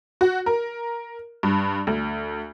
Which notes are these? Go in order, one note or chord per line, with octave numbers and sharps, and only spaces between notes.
F#4
A#4
G2
D2